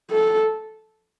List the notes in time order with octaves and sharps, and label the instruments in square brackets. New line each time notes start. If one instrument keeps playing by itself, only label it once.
[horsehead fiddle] A4